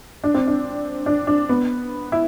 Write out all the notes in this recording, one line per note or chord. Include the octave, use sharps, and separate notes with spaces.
D4
C4
D4
D4
D4
B3
E4